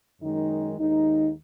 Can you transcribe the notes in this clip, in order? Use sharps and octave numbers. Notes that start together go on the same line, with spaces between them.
F#2 D#3 G#3 D#4
D#2 D#3 G#3 D#4